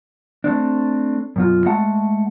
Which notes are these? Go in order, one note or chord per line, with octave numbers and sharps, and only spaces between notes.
A3 C4 D4
F#2 B2 F4
G#3 A3 F#5 A5